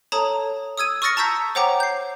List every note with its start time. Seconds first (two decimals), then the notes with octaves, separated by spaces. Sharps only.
0.12 A4 C#5 A5 A#5 D#6
0.78 D#6 E6 G#6 D#7
1.02 C#6 D#6 F6 A6 A#6 C#7
1.17 A5 A#5 C#6 E6 G6 B6
1.55 C5 C#5 F#5 G5 A#5 D6
1.80 G6 C7